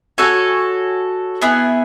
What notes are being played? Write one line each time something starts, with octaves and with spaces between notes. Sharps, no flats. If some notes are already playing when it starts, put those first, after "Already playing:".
F#4 A4 C#5 G#5
B3 E4 G#4